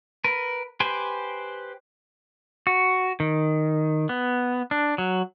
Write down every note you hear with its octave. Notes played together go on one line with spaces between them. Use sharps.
A#4 B4
G4 B4 C5 G5 G#5
F#4
D#3
B3
D4
F#3